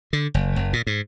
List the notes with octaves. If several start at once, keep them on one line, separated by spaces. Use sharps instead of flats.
D3
F#1
F#1
A#2
G#2